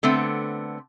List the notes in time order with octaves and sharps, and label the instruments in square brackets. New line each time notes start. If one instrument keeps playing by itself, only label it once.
[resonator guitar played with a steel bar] D3 A3 B3 C4